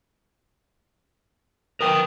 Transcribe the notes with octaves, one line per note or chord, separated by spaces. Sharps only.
A#4 B4 G5 D#6